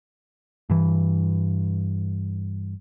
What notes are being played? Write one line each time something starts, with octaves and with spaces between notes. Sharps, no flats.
G2 E3